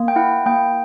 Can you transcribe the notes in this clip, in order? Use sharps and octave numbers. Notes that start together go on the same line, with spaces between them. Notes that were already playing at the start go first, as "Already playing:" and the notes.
Already playing: A#3
G5
E4 F#5
A#3 G5